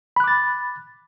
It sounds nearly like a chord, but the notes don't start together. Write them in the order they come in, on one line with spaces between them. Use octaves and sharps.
B5 F#6 D6 A6